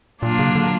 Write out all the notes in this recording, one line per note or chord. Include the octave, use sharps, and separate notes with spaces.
A#2 F#3 A#3 D4 F4
C#3
D3